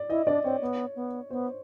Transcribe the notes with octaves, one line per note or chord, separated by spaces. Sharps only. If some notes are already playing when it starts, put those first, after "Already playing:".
Already playing: D5
E4 D#5
D4 D5
C4 C#5
B3
B3
B3 C5